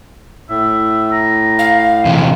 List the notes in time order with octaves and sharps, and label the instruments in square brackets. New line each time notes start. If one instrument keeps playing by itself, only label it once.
[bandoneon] A2 [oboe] E5
[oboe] A#5
[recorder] F5
[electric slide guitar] E2 C3